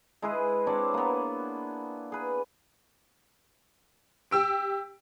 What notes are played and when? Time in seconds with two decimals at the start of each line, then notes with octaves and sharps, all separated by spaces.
0.22 G#3 E4 G#4 B4
0.67 C4 D4 C#5 D5
0.94 A#3 B3
2.12 G#4 B4
4.31 G4 E6 D7